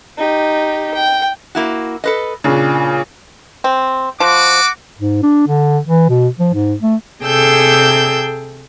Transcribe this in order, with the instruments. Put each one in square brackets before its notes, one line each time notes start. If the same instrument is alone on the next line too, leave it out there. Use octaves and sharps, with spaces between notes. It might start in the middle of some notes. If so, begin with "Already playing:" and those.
[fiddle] D#4 G4
G5
[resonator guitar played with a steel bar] A#3 E4 F#4
A4 B4 D#5
[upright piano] A#2 C#3 [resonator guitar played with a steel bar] D4
[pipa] C4
[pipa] F3 [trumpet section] F#4 D6
[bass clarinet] G#2
D4
D3
E3
B2
F3
G#2
A3
[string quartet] C3 G#4 A4 G5 E6 G6